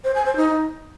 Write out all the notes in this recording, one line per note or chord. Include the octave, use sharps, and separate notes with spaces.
C5
G#5
C5
D#4